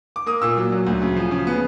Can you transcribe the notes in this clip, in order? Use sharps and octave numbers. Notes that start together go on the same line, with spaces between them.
D6
A#3 D#6
A#2 E6
F#3
F#3
D2
C#3
F3
C#3
B3